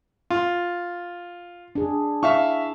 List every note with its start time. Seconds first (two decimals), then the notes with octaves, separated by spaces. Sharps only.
0.30 F4
1.75 D4 G#4
2.23 E4 E5 F5 C#6